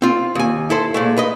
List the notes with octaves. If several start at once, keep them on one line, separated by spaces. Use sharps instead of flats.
C4 F4
D#2 G#5
E4 A4 C5
A#2 G#3 A3
B4 D#5